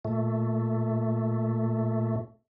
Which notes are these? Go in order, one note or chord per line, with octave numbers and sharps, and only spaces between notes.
A#2 A3